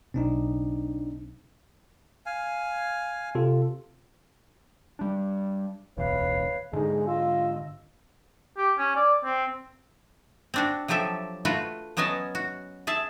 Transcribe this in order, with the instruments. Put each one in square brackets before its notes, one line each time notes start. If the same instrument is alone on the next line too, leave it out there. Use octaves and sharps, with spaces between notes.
[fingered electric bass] B1 C#3 [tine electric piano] C4 D4 D#4
[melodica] F5 G#5
[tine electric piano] C3 F4 A4
[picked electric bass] G3 D4
[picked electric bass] D1 B1 E2 [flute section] B4 C#5 F5
[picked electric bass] G#2 D3 [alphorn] G#3 [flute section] D#4
[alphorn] F4 [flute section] D#5 E6
[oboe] G4
C#4
D5
C4
[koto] C4 D4 F#4
F3 F#3 G4 A4 E5
A3 F4 F#4 B4
F#3 B3 C#4 D#5 G#5 A5
F#4
G#4 E5 A5